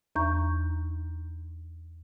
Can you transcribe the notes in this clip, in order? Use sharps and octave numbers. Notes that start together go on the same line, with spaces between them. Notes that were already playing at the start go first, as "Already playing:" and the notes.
E2 D#4 A#5 C#6 G6